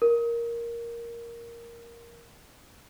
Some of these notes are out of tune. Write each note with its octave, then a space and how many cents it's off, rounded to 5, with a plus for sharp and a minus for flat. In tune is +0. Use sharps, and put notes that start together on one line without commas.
A#4 +5